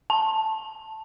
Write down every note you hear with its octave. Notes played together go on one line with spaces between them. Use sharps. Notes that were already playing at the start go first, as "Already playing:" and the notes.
A5